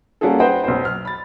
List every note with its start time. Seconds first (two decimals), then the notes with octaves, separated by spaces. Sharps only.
0.21 G3 A#3 C#4 F#4 G#4 A4
0.40 B4 C5 D#5 F#5 G5
0.64 B1 C5
0.85 F6
1.05 B5 A6